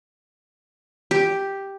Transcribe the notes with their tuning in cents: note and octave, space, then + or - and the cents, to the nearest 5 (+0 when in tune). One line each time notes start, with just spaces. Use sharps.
G4 +0